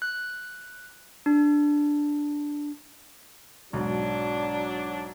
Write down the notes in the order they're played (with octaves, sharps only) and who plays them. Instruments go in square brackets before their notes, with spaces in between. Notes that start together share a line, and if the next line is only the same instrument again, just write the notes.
[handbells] F#6
D4
[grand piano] B1 G#2 [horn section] F#3 D4